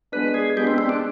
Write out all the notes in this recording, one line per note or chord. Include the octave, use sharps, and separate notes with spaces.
G#3 B3 D4 B4
G#4
G#3 B3 D4 G4
C4
C4
D4